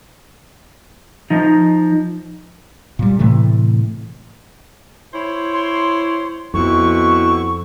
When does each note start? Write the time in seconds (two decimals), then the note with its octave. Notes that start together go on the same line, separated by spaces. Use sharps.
1.30 F3 D#4
2.99 A#2 G3
3.19 A2 C3 E3 A3
5.14 E4 C5 C#5
5.54 C6
6.54 F2 B2 C4 E4 C#6